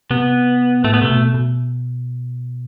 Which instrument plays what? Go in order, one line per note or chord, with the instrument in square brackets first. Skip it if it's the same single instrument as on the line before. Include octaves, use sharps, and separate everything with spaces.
[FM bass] C3 [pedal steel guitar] B3
[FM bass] A2 [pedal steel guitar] A3
[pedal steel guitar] B3
[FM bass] C3 [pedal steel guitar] A3
[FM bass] B2
B2